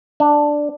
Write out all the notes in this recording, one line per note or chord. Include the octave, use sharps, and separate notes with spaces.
D4